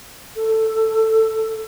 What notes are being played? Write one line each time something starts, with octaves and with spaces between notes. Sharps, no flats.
A4